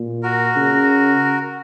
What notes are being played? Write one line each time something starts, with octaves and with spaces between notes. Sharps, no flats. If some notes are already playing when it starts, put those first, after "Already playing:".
Already playing: A#2
F#4 A#4
C#3